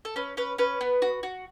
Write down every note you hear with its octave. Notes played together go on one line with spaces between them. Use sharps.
A4
C#4 B4
C#4 B4
C#4 B4
B3
F#4
F#4